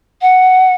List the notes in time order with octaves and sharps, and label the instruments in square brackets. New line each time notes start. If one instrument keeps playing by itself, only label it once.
[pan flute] F#5